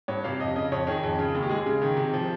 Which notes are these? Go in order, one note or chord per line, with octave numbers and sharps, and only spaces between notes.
G2 C#5
C3 F5
F2 D#5
C#3 D#5
F2 C#5
D#3 G#4
F2
C#3
D#2
G4
G#3 G#4
C#3
D#3
C3
F3